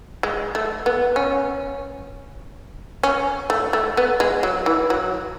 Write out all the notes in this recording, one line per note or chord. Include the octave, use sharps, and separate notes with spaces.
G#3
A3
B3
C#4
C#4
A3
A3
B3
G#3
F#3
E3
F#3